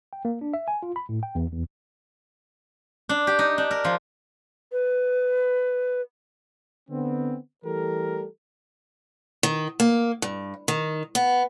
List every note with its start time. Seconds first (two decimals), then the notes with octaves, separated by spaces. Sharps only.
0.13 G5
0.25 A#3
0.41 D4
0.54 E5
0.68 G#5
0.83 F4
0.96 B5
1.09 A2
1.23 G5
1.35 E2
1.52 E2
3.09 D4
3.27 G4
3.39 D#4
3.58 D4
3.71 A#4
3.85 F3
4.72 B4
6.90 D3 B3 C4
7.64 E3 G3 A3 G4 A4 A#4
9.43 D#3
9.80 A#3
10.22 G2
10.68 D#3
11.15 B3